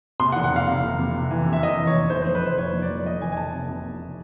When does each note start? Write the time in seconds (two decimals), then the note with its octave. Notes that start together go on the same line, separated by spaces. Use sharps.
0.20 C3 C6
0.32 F#5
0.36 F1
0.44 F#5
0.51 C3 F5
0.68 C3
0.84 F1
0.99 C3
1.15 C3
1.31 E3
1.46 C3
1.53 E5
1.63 E3 D#5
1.79 E3
1.87 C#5
1.94 F1
2.10 F1 C5
2.22 C5
2.26 F2
2.35 B4
2.43 F1 C5
2.58 F1 C#5
2.74 F2
2.82 D5
2.90 F2
3.05 F2 D#5
3.21 F1 G#5
3.32 G#5
3.37 F1 A5
3.53 C3
3.69 C3
3.85 C3